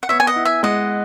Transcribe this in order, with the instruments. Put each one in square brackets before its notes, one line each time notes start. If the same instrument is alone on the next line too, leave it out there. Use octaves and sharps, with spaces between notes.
[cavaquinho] F#5
[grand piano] B3 [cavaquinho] C#5 E5
[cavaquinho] G#5
D#5 F#5
[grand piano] E4
[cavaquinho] E5 G#5
[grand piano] G#3 [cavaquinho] D#5 F#5